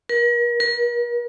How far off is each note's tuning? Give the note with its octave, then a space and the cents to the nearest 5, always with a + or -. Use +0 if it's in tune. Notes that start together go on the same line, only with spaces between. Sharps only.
A#4 +40
A#4 +45